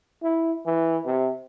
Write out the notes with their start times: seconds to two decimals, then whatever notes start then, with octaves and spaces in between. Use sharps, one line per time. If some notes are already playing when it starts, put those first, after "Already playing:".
0.23 E4
0.66 E3
1.06 C3